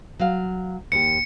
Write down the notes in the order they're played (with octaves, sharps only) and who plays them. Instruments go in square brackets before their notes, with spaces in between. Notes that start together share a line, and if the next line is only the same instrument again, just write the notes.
[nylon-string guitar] F#3 F5
[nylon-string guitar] D#2 G4 [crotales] C#7